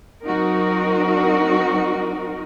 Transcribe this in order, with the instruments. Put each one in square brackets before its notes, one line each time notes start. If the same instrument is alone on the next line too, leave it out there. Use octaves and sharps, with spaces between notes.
[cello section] F#3 C4 D#4 F#4 A#4